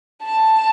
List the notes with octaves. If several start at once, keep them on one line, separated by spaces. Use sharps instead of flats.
A5